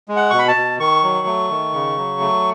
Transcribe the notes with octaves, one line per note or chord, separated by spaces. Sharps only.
G#3
F#5
B2 C#6
B5
A5
B2
D#3 C#6
F#3
A3
D#3
C#3
F#3
A3